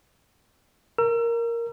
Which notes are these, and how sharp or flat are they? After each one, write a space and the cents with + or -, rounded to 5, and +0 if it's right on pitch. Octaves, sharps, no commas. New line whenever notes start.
A#4 +0 E6 +40